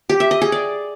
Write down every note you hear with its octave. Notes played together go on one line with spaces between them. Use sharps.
G4
E5
D#5
G#4
D5